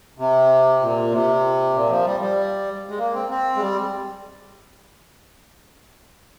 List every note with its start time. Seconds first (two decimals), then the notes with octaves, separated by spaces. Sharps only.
0.18 C3
0.80 A#2
1.11 C3
1.74 A#2
1.89 F3
2.05 G3
2.20 G3
2.89 G#3
2.98 A#3
3.15 C4
3.29 C4
3.56 G#3
3.61 G3